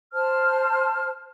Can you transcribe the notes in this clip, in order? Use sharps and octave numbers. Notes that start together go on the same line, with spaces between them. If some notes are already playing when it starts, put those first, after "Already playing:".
C5 A5 F6